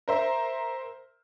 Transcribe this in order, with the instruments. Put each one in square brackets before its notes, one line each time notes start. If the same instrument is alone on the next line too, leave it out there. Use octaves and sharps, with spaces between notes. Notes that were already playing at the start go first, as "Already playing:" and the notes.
[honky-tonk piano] A#4 C5 E5